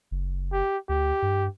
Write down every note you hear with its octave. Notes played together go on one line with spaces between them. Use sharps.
F#1
G4
D2 G4
G2